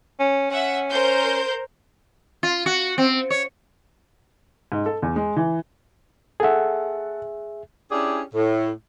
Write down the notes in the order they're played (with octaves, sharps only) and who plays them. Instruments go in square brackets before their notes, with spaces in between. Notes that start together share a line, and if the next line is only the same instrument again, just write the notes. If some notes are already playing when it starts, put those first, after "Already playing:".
[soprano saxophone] C#4
[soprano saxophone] C#4 [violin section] E5 F#5
[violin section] A#4 C5 G6
[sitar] F4
F#4
C4
C#5
[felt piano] G#2
A4
E2
G#3
E3
[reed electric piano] G#4 E5 [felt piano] A4 F#5
[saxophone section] C#4 D4 E4 G4 G#4 D5
A2